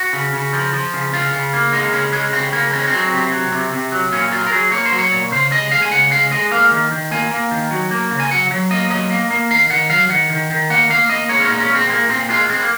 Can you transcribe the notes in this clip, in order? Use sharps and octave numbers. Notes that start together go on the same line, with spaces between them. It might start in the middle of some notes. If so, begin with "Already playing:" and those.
Already playing: F#4
C#3
C#3
F3
F3
C#3
C#3 F4
C#3
A#3
G#3 D#4
C#3 C#4
G#3 C#4
C#3 C4
C#3 A#3
G#3 C4
C#4
C4
F#3
C3
F#3
C3
C3
F#3
A#2 C#4
F#3 F4
A#4
F#3 G#4
A#3 C#5
C5
F#3
C#5
A#2
C#3 C5
G#3 D#5
G#3 F5
G#5
C#3 F#5
G#3 F5
G#3 D#5
A#3 F5
D#3
D#3
A#3 G#5
A#3
D#3
F#3
A#3
C#3
G#5
F#3 F#5
F#3
A#3 D#5
F#3 D#5
A#3
A#3
D#3 F5
D#3 F#5
F#3 F5
D#3 F#5
D#3
D#3
A#3 F#5
A#3 F5
A#3 D#5
G#3 C#5
C#4
A#2 D#4
C#4
G#3
C4
A#2 A#3
A#2 C4
G#3 F4
G#3 C4
A#3